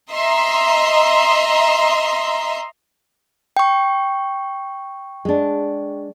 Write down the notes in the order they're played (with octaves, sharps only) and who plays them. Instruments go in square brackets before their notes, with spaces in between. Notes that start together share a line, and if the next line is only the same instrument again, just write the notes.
[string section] D#5 E5 A#5 C6
[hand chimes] G5 C#6
[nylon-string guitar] G#3 D4